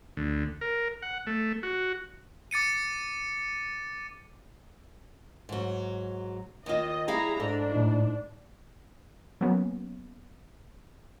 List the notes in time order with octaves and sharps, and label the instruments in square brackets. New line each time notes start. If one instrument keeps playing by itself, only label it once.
[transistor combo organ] D2
A#4
F#5
A3
F#4
[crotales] D6 A6 C#7 D#7
[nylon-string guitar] G#2 F#3
[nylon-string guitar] D#2 F4 [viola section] D#5
[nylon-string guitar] G3 E4 F5 [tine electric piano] G4 [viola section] G#4 A#5
[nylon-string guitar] G#2 [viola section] D4 [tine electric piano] A4
[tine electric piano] A2 D#4
[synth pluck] F#3 A#3 B3 C#4